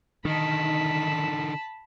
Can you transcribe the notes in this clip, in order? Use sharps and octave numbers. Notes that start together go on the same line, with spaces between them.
D3 D#3 D#4 A5 B5